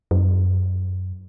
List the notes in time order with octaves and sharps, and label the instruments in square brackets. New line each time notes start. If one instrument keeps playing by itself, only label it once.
[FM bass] F#2